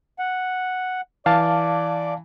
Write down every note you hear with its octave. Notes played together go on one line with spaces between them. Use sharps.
F#5
E3 D5 F5 A5 D6